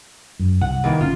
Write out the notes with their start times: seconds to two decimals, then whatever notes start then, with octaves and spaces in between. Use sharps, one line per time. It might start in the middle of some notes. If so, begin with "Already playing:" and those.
0.40 F#2
0.61 C2 F#5
0.84 D#3 E3 A#3
1.01 G#1 D3 C#4 F4